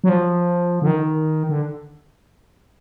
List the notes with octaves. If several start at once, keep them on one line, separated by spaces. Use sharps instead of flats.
F#3
F3
D3
D#3
D3